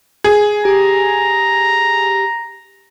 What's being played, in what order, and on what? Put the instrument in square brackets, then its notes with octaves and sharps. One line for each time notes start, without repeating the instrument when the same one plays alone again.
[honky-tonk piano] G#4
[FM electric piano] G4 [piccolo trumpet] A#5